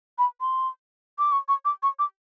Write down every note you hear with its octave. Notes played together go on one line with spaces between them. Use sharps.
B5
C6
D6
C#6
C#6
D6
C#6
D6